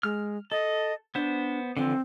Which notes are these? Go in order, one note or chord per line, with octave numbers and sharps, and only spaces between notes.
G#3 F6
A4 D#5
B3 D4 C5
D3 E3 F3 C4